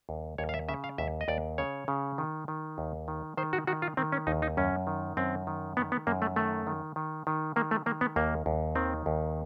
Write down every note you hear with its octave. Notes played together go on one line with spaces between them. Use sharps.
D#2
D#2 C#5
F5
E5
C#3 E5
F5
D#2 E5
D#5
D#2 D5
C#3 C#5
C#3
D#3
D#3
D#2
D#3
D#3 C5
F#4
D#3 F#4
F4
D#3 C4
C#4
D#2 D#4
D#4
F#2 C#4
D#3
F#2 C4
D#3
D#3 B3
B3
F#2 A#3
A3
D#3 A3
D#3
D#3
D#3
D#3 A#3
A3
D#3 A#3
B3
D#2 A#3
D#2
D#3 C4
D#2